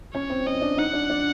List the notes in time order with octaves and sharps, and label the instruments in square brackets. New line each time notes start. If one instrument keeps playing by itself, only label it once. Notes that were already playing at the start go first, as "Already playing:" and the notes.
[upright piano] C#4 [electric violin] C#5
[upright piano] C4
[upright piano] C#4 [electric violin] D#5
[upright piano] D4
[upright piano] D#4 [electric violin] F#5
[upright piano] D4
D4